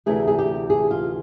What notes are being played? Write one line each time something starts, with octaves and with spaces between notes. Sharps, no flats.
D2 C3 E3 A3 G#4
G#4
G4
G#4
F4